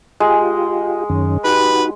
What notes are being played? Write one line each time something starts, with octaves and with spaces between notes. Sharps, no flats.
G#3 F4 G4
F#2 D#3 C#4
D#4 F#4 G4 B4